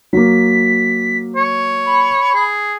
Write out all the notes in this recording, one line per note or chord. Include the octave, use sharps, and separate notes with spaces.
F#3 A#3 B6
C#5
B5
G#4